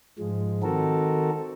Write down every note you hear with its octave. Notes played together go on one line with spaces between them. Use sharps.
G#2 F3 G#3
D#3 C4 F#4 A4 A#4